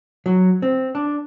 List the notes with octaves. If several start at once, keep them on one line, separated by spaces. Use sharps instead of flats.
F#3
C4
D4